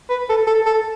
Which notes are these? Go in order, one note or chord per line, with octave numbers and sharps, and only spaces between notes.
B4
A4
A4
A4